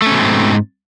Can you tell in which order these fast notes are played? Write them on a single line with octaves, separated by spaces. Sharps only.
A3 C#4 B2 C4 G#2